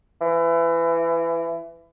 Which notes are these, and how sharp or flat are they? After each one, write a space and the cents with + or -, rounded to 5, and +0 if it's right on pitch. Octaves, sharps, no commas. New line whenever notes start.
E3 +25